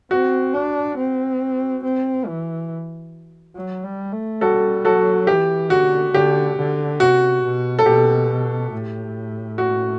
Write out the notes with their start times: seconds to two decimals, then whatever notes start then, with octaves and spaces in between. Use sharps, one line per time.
0.11 C4 F#4
0.54 D4
0.98 C4
1.84 C4
2.27 E3
3.56 F#3
3.84 G3
4.13 A3
4.41 G3 F#4 A4
4.85 F#3 F#4 A4
5.27 E3 G4
5.70 D3 F#4
6.13 D3 G4
6.58 D3
7.00 C3 F#4
7.43 B2
7.79 A4
7.86 B2 G4
8.72 A2
9.58 F#4